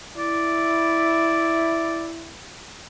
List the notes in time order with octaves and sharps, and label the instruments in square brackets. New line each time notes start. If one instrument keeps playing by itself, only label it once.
[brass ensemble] E4 [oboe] D5